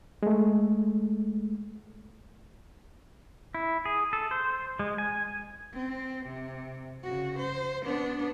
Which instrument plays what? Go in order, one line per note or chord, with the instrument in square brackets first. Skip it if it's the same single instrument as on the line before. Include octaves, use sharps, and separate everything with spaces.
[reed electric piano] G#3 A3
[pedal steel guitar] E4
G#4
A4
C5
G#3
G#5
[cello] C4
C3
C#3 F#4
C5
B3 D4